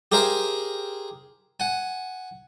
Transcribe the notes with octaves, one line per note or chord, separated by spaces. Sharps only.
G4 G#4 A#4 C5 E5 G5
F#5 G#5